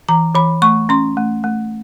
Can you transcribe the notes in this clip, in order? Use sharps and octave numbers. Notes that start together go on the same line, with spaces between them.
E3 A#5
E3 B5
A3 C#6
C#4 C6
A3
A3